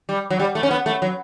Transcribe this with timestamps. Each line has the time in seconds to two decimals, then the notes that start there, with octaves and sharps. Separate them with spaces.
0.09 G3
0.30 F#3
0.40 G3
0.55 A3
0.63 C#4
0.71 B3
0.86 A3
1.02 F#3